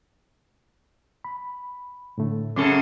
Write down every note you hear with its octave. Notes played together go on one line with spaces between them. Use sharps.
B5
A2 D3 A3
F#2 C#3 A4 C#5 C#6 D6